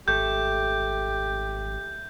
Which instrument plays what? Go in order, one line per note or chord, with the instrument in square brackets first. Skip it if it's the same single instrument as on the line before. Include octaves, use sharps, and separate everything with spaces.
[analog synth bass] G#1 [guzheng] A3 [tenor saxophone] G4 [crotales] G6